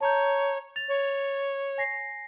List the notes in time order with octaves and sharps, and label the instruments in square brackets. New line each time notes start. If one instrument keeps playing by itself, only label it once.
[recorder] C#5 [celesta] A5 A#5 G6
[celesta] A6 F7
[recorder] C#5
[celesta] G#5 A#6 C7